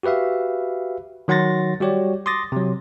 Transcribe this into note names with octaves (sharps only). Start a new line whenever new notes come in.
F#4 G4 B4 E5 F5
D#3 F#3 F#5 C6 A6 A#6
G3 F#4 G4 C#5 D5
C6 D6 D#6 A6 A#6
C3 F#3